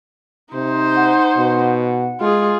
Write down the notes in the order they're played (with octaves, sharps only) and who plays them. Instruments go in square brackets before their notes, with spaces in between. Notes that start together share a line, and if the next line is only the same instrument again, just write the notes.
[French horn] C3 [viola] D#4 C5
[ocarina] F#5
[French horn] B2
[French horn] G#3 [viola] F4 G#4